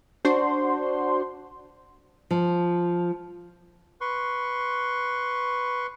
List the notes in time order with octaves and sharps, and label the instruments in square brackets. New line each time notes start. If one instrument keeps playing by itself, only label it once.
[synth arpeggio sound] D4 F#4 C5 C6
[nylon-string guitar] F3
[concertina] B4 C6 C#6